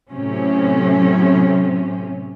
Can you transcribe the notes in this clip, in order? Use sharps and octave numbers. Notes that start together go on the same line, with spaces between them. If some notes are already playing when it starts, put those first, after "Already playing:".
A2 C3 F#3 C4 C#4